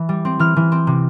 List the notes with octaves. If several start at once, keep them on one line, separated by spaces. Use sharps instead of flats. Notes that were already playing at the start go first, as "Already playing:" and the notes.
Already playing: E3
G3
C4
E3 F6
E3
C4
C3